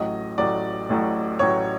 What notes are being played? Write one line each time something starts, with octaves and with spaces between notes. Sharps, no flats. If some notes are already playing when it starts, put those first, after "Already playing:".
Already playing: A1 A2 F#3 D#5
A1 A2 F#3 D5
A1 A2 F#3
A1 A2 F#3 C#5